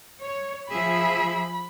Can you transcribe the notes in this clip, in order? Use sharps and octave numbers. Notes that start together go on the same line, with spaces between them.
C#5
F3 G#4 E5 B5